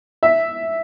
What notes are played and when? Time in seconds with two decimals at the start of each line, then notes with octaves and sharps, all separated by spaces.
0.23 E5